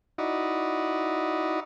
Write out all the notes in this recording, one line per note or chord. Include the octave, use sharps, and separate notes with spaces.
D#4 E4 F#4 D5 D#5